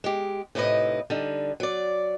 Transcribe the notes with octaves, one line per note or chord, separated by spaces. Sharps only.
G#3 G4
A2 C3 D#4 E4 B4 D#5
D3 G3 D#4
F#3 D5